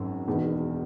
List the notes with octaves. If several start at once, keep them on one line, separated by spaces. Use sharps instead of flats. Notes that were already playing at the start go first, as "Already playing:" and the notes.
Already playing: G#1 F#2 D#3 F#3
E1 E2 D#3